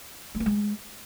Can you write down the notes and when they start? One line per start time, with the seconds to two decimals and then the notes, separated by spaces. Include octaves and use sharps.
0.35 G#3
0.40 B3
0.46 G#3